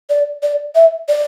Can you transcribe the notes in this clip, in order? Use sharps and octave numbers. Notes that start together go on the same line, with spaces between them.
D5
D5
E5
D5